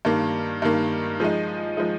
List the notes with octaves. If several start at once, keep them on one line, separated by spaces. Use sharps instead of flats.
G2 D#3 A#3
G2 D#3 A#3
F3 G#3 D#4
F3 G#3 D#4